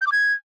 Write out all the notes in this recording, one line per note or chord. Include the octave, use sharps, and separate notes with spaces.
G6
D6
G#6